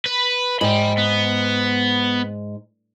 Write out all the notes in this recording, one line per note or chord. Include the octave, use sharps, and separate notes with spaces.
B4
G#2 G5 B5
B3